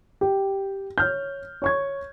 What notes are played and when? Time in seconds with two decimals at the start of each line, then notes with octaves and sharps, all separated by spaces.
0.21 G4
0.98 C#5 F6 G6
1.62 C#5 C#6 G#6